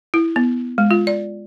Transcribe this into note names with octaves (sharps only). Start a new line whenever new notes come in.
E4
B3
G#3
F4
D5